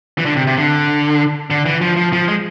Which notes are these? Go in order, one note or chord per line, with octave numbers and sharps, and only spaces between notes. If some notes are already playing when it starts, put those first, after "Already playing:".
E3
D3
C3
C3
D3
D3
E3
F3
F3
F3
G#3